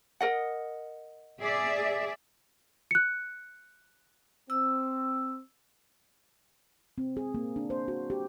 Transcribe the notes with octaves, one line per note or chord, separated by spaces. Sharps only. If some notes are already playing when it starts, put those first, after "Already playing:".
A#4 D#5 F#5
G#4 D5 E5
F#6 C#7
C4 E6
C4
G#4
A#3
D4
C5
F#4
G4